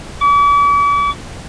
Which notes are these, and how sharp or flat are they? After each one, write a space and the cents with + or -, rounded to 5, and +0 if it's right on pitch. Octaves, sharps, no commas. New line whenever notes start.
D6 -45